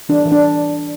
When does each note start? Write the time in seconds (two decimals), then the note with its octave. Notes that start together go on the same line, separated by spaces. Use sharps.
0.09 E3 D4
0.26 E3
0.32 D4